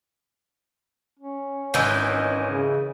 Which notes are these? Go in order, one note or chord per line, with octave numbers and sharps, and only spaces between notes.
C#4
G#1 D#3 E3 G#5 G6
C#3